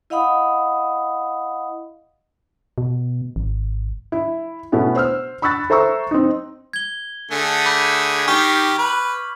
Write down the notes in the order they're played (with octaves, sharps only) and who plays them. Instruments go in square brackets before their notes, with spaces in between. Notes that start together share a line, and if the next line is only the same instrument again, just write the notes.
[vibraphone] E4 D#5 F5 F#5 B5 D#6
[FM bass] B2
G#1
[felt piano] E4
B2 A3 B3 C#4 E4
C5 E6 F6
B5 C#6 E6 F#6 A6
A4 C5 E5 A#5 C#6 E6
C4 D#4
[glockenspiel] G#6 G7
[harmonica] D3 A3 G#4
[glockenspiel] B5 D6 G6
[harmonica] D#3 G4 [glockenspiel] C#6 F6 B6
[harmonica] B4